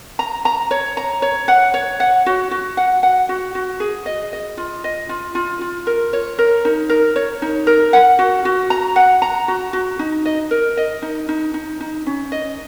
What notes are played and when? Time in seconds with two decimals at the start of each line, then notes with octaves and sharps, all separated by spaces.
0.19 A#5
0.45 A#5
0.71 C#5
0.97 A#5
1.22 C#5
1.48 F#5
1.74 C#5
2.00 F#5
2.26 F#4
2.51 F#4
2.77 F#5
3.03 F#5
3.29 F#4
3.55 F#4
3.80 G#4
4.06 D#5
4.33 D#5
4.57 F4
4.84 D#5
5.09 F4
5.35 F4
5.61 F4
5.87 A#4
6.13 C#5
6.39 A#4
6.65 D#4
6.89 A#4
7.16 C#5
7.42 D#4
7.67 A#4
7.93 F#5
8.19 F#4
8.45 F#4
8.70 A#5
8.96 F#5
9.22 A#5
9.48 F#4
9.73 F#4
9.99 D#4
10.25 D#5
10.51 A#4
10.77 D#5
11.02 D#4
11.29 D#4
11.54 D#4
11.80 D#4
12.06 C#4
12.32 D#5